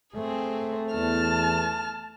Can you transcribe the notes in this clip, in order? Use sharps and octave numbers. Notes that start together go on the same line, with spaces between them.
A3 C4 G#4
E2 A5 F6